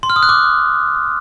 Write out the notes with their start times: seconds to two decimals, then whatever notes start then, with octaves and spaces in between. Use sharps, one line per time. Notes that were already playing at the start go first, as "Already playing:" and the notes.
0.03 C6
0.10 F6
0.16 D#6
0.23 F#6
0.29 D6